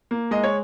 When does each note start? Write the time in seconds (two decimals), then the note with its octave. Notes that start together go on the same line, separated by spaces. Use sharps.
0.11 A#3
0.31 G#3 D#5
0.43 C#5